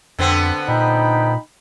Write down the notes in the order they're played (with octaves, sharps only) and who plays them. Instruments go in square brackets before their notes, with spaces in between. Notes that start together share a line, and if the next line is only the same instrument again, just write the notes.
[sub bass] F2 [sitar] D3 B3 C4
[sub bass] A#2 [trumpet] D#4 [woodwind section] G5 B5